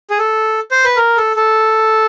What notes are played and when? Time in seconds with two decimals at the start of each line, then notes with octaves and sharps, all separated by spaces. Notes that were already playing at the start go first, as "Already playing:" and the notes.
0.10 G#4
0.19 A4
0.71 C5
0.84 B4
0.97 A#4
1.17 A4
1.36 A4